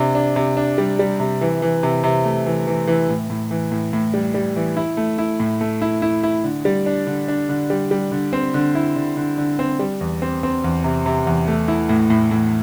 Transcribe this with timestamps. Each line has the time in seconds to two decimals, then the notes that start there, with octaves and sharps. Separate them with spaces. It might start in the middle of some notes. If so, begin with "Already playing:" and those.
Already playing: C3 D4
0.15 D4
0.36 C3
0.57 D4
0.78 G3
0.99 G3
1.20 C3
1.41 E3
1.62 E3
1.83 C3
2.04 C3
2.25 A3
2.46 E3
2.67 E3
2.87 E3
3.09 A2
3.30 A2
3.51 E3
3.72 A2
3.93 A2
4.14 G3
4.34 G3
4.56 E3
4.77 E4
4.97 A3
5.18 E4
5.40 A2
5.61 A3
5.82 E4
6.02 E4
6.23 E4
6.44 D3
6.65 G3
6.86 D4
7.07 D3
7.28 D4
7.49 D3
7.70 G3
7.91 G3
8.12 D3
8.33 C4
8.54 D3
8.75 E4
8.96 D3
9.17 D3
9.38 D3
9.59 C4
9.79 G3
10.01 E2
10.22 C4
10.43 C4
10.64 E2
10.84 C3
11.06 C3
11.27 E2
11.48 A3
11.68 E4
11.89 A2
12.10 A2
12.31 A2